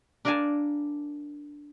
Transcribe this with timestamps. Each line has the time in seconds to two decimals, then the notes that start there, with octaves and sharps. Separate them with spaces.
0.25 D4 A#4 D5 F5 G#5 A5